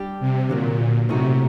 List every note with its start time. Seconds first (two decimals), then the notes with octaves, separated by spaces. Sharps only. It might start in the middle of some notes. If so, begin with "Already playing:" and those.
Already playing: G3 D4 G4
0.20 C3
0.49 A#2 D3 F#3 A#3
1.09 A2 C3 A3 D#4 F#4